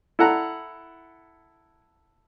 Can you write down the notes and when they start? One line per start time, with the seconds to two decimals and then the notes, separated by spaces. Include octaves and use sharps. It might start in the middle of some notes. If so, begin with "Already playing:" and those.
0.19 E4 A4 F#5 A#5